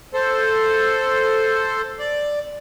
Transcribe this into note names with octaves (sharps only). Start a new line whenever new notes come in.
A4 C5
D5